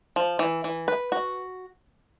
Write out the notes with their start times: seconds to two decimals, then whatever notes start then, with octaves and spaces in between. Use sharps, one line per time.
0.16 F3
0.39 E3
0.64 E3
0.88 B4
1.12 F#4